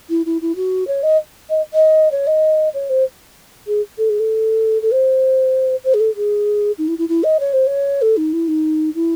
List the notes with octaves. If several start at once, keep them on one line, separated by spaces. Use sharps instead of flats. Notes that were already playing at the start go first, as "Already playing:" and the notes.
E4
E4
E4
F#4
C#5
D#5
D#5
D#5
C#5
D#5
C#5
C5
G#4
A4
G#4
A4
A4
C5
C5
G#4
A4
G#4
D#4
E4
E4
E4
D#5
C#5
C5
C#5
A4
D#4
E4
D#4
E4